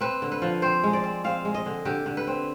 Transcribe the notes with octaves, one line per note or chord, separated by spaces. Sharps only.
C4 B4
D3
B4
F3
C4 C5
G#3
D5
C4
C4 F5
G#3
D#5
D3
D3 G4
D3
B4
C4